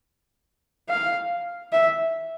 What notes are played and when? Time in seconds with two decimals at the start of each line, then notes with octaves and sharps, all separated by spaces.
0.89 F5
1.72 E5